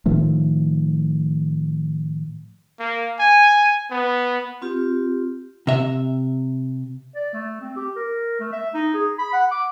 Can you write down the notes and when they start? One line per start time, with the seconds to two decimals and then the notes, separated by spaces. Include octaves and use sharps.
0.06 A2 D#3 F3 A3
2.79 A#3
3.20 G#5
3.91 B3
4.62 C4 F4 G4
5.67 C3 E5
7.15 D5
7.33 A3
7.61 C4
7.76 G4
7.96 A#4
8.40 A3
8.52 E5
8.74 D#4
8.94 G#4
9.19 B5
9.33 F#5
9.51 D6